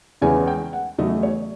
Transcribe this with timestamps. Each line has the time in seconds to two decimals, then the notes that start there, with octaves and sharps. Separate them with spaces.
0.21 E2 C#3 E3 G#3 C#4 G#5
0.47 G5
0.73 F#5
0.98 E2 C#3 F#3 A3 D#5
1.23 C#5